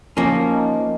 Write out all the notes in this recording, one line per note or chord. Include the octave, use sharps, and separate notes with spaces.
F3 A#3 C#4
D#4